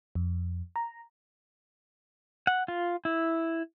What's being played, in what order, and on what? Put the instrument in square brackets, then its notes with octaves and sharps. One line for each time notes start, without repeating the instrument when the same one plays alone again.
[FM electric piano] F2
A#5
[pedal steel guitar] F#5
F4
E4